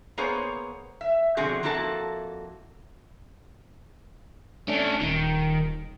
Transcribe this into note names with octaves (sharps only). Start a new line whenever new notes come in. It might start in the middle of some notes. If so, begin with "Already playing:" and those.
A#3 B3 G#4 C5 C#5
E5
B2 D3 F3 C4 F#4 G#4
F2 A#3 E4 F#4 A4 A5
A3 C#4 D4
D#1 D#3